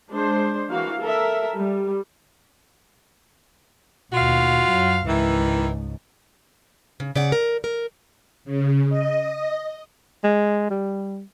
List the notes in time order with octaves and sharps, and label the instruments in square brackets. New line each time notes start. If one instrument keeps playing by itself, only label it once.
[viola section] G#3 D4 C5
E3 A#3 F#4 F5
A4 A#4 E5
G3
[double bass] D#2 B2 [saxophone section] F4 F#4 F5
[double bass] F#2 F#3
[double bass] C#2 G#2 [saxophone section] D#3 E3
[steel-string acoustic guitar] C#3
C#3 D5 F#5
A#4
A#4
[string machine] C#3
D#5
[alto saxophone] G#3
G3